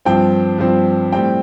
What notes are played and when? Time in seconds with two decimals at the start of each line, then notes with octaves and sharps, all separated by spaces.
0.05 G2 F3 C4 G5
0.58 G2 F3 C4
1.12 A2 G3 C4 G5